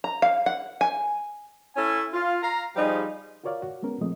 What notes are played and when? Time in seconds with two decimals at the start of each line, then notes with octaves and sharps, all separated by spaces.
0.04 A#5
0.22 F5
0.46 F#5
0.81 G#5
1.76 C#4 E4 A4 C#5 G#5
2.13 F4
2.43 F5 A#5
2.76 F3 G3 D#4 G4 G#4
3.44 F4 F#4 A#4 C#5 D5 F5
3.62 F#4
3.82 G#3 B3 C#4 A#4
4.01 A#2 F3 G#3 A3 C4 D#5